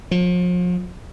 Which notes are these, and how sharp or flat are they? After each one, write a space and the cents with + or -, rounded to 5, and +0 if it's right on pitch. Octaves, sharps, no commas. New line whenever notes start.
F3 +40